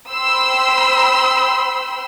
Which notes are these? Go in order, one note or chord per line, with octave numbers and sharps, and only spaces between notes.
C5 G5 B5 C6 E6